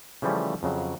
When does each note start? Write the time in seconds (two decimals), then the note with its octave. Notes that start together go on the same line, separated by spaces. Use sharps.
0.22 C#3 E3 F3 G3 A3 C#4
0.63 F2 C#3 F#3